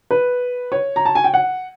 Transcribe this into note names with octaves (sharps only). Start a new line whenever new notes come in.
B4
C#5
A#5
A5
G#5
G5
F#5